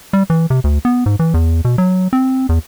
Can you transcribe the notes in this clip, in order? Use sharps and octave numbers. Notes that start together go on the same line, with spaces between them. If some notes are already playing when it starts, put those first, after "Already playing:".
G3
E3
C3
D2
B3
G#2
E3
E2
B2
F#3
C4
E2